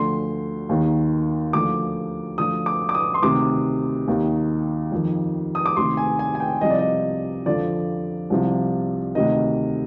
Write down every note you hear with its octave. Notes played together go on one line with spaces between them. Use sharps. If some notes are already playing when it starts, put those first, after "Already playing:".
Already playing: D2 D3 F3 C6
D#2 D#3
D2 D3 F3 D6
D2 D3 F3 D#6
D6
D6
D#6
C6
D2 C3 D#3 D6
D#2 D#3
F2 D#3
D#6
D6
D2 C3 D#3 C6
G#5
G#5
G#5
G5
C2 C3 F3 D#5
D5
D#5
F2 D3 F3 D5
C2 C3 F3
D2 C3 D#3 D#5